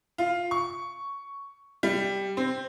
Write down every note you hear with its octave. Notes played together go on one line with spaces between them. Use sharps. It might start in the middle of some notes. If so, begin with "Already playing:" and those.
F4
C#6
G3
C4